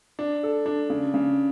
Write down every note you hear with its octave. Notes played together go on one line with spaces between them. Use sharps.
D4
A4
D4
C#3
C#3